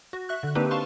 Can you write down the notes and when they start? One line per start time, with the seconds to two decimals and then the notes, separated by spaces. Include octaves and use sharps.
0.13 F#4
0.29 E5 C#6 F#6
0.43 D3 F#6
0.55 A#3 C4 D4 D#4 G4 B4
0.71 F5 A5 C6 C#6